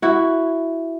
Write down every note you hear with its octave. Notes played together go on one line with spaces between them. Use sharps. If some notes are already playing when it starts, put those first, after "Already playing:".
E4 F#4